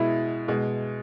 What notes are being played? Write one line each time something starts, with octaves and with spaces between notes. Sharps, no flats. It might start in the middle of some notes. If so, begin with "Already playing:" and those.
Already playing: B2 G#3 E4
B2 G#3